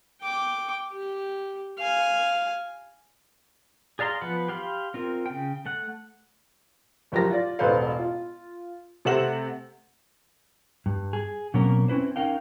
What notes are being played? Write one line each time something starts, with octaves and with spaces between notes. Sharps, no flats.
G5 D6
G4
F5 G#5
G#4 D5 F5 A#5 C6
F3 B3 B4 F#5 B5
G4 F5 B5 C6
C4 F4 A#4
C#3 G5
A3 F#5
F#1 F3 G4 A#4 A#6
F4 D5
E1 A1 A4 B4 C5 F5
F4
C3 A3 C4 F#5 E7 F#7
G2
G#4
B2 F#3 A#3 C4 C#4 A#4
C4 C#4 E4 B4 C5
C#4 D#4 A#4 F5 G5